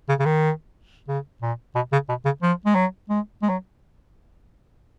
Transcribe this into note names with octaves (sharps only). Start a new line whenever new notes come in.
C#3
C#3
D#3
C#3
A#2
B2
C#3
B2
C#3
F3
G#3
F#3
G#3
G#3
F#3